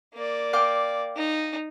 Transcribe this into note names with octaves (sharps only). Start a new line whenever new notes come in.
A#3 D5
F5 G5 D6
D#4